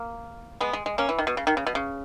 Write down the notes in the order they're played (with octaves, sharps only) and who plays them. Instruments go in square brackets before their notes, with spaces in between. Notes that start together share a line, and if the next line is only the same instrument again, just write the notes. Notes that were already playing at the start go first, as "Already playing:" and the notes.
Already playing: [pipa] A#3
G#3 B3
G#3
G#3
A#3 C#4
E3
D#3
B2
C#3
D#3
C#3
B2
C#3